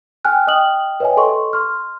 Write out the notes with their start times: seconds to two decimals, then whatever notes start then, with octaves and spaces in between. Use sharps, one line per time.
0.25 G5 G#5 F6 F#6
0.47 D#5 G5 D#6 F6 F#7
1.00 B4 C#5 D#5 E5 G5 G#5
1.17 A4 D#5 C6 C#6
1.53 C6 F6